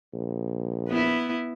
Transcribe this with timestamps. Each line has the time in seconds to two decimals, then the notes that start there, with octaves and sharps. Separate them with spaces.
0.14 A#1
0.88 B3 E4